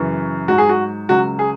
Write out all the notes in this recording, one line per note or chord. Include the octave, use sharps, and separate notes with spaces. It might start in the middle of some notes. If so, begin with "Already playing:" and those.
Already playing: F#2 C#3 E3
G#2 F#3 F#4
G#4
F#4
C#2 C#3 F#3 F#4
G#4